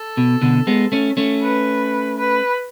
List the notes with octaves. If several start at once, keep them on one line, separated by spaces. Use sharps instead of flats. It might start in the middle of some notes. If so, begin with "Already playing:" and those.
Already playing: A4
B2
B2 D3
G#3 B3
A3 C#4
A3 C#4
B4
B4